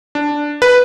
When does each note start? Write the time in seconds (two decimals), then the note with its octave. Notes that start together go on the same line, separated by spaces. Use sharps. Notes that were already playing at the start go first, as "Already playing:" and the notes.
0.15 D4
0.62 B4